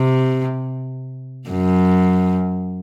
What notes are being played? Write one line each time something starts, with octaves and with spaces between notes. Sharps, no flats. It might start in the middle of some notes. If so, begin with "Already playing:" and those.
Already playing: C3
F#2